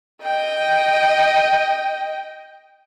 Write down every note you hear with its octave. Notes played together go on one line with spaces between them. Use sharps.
D#5 G5